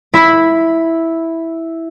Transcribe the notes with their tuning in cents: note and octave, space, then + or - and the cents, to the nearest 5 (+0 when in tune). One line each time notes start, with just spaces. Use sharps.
E4 -5 B5 +0